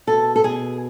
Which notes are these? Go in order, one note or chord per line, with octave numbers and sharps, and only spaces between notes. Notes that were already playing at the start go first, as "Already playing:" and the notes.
B2 A4
A4
B2 G#4